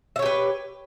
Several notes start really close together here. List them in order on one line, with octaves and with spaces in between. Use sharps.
E5 C#5 G4 B4